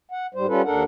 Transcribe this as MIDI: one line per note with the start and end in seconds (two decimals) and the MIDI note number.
0.11 0.27 78
0.34 0.47 44
0.34 0.47 55
0.34 0.47 72
0.47 0.62 55
0.47 0.62 61
0.47 0.62 65
0.47 0.62 69
0.47 0.62 71
0.64 0.83 39
0.64 0.83 62
0.64 0.83 69
0.64 0.83 70
0.64 0.83 78